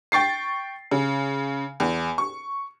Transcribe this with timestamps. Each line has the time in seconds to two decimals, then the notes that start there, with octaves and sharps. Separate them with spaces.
0.12 G5 C#6 A6 C7
0.91 C#3
1.80 E2
2.18 C#6